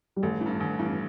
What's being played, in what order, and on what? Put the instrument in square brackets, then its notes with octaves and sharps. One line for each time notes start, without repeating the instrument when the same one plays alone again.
[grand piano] G3
[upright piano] A1 [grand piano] A3
[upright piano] E3
G2
A1
G2 E3